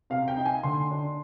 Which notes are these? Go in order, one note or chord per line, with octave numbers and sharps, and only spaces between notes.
C3 F5
G5
D#4
G#5
D3 C6
D4